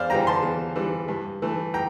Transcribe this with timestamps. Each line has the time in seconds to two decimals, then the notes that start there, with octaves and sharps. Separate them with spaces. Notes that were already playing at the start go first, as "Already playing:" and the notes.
Already playing: E2 C5 D5 F5
0.10 E3 G3 G5 A#5
0.27 A5 C6
0.43 E2
0.76 E3 G3
1.08 G2
1.42 E3 A3
1.74 G5 A#5